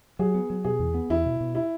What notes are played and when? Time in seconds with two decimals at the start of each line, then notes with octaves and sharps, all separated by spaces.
0.19 F#3 G#4
0.34 B3
0.50 F#3
0.65 B2 G#4
0.79 E2
0.94 B3
1.10 E2 E4
1.25 B2
1.40 B2
1.55 E4